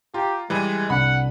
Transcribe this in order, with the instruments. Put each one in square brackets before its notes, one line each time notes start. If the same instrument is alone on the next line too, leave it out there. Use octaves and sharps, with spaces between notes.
[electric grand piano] F4 [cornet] G4 [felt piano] A#5
[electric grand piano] E3 G3 [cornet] G#3 [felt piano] D#5 B5 D#7
[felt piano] C2 D4 D5 [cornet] F#5 [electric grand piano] B5